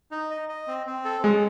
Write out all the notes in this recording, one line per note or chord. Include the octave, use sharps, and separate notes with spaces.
D#4
D#5
D#5
C4
C4
A4
G#3 C#4